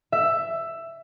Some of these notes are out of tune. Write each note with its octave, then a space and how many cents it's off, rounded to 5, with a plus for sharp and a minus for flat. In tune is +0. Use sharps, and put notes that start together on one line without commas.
E5 +10